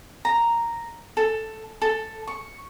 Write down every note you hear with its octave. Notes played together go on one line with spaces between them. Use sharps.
A#5
A4
A4
C#6